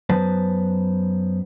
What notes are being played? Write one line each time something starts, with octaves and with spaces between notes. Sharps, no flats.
F#2 F#3 B3 B4 C5 A5